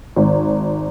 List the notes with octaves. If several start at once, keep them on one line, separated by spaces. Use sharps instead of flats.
G#1